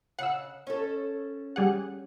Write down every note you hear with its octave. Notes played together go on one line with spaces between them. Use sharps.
C#3 F5 F#5 E6
C#4 A4
G3 G#4 F#5